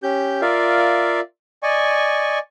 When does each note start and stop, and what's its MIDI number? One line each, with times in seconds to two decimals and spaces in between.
0.03 0.41 61
0.03 0.41 67
0.03 0.41 91
0.41 1.20 65
0.41 1.20 70
0.41 1.20 74
0.41 1.20 76
0.41 1.20 77
1.63 2.39 74
1.63 2.39 75
1.63 2.39 80
1.63 2.39 85